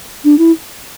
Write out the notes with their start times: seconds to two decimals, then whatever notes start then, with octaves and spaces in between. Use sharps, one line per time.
0.24 D4
0.38 E4